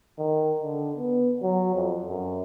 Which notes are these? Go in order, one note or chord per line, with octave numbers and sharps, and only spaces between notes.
D#3
D3
B3
F#3
F2
F#2